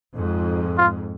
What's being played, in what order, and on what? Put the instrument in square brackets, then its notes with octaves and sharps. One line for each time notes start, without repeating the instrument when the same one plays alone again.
[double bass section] F2 G#2
[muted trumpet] F4